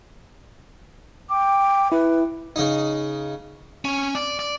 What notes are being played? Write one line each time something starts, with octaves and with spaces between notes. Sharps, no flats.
G5 D6
E4 B4
C#3 D#4
C#4
D5
D5